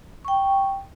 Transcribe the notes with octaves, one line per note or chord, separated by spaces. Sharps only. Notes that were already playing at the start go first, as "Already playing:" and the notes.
G5 C#6